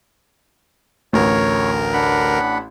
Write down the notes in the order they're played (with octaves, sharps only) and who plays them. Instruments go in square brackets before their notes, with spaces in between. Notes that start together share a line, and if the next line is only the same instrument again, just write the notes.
[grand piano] A1 [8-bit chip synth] D2 A#4 [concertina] C#5
[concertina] D4 F#5 B5